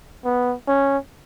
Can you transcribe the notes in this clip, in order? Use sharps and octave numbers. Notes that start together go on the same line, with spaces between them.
B3
C#4